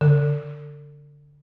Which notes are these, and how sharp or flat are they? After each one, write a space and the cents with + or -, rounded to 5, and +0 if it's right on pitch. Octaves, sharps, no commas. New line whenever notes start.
D3 -25 A4 +45